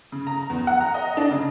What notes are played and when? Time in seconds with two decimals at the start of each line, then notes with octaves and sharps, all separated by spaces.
0.12 C#3
0.27 A#5
0.49 E2
0.67 F#5
0.81 A#5
0.94 D#5
1.17 D4
1.30 C#3